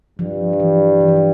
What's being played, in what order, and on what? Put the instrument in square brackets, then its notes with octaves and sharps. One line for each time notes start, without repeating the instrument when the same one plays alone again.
[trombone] G2 [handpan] F3
[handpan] F3
E3
E3
F3
E3